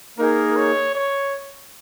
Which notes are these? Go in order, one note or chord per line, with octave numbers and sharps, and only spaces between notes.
A#3 D#4 G#4 A#4
C#5
C#5